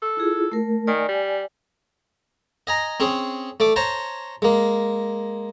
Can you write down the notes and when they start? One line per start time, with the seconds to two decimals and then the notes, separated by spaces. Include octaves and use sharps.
0.02 A4
0.17 E4 F4 G#4
0.52 A3 A#4
0.87 D#3 D5 G#5
1.08 G3
2.67 D#5 G#5 A#5
3.00 C4 C#4 G#4
3.60 A3 D5 D6
3.76 C5 C#5 A5 A#5
4.42 G#3 A#3